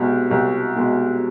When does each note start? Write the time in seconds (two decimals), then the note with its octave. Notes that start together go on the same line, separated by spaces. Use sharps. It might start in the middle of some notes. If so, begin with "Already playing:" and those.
Already playing: C2 B2 G#3
0.31 C2
0.76 B2 G#3